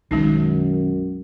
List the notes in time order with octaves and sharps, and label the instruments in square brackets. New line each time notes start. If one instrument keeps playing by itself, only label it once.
[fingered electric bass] B1 D#3 [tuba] F#2 [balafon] G#3 C#4 D#4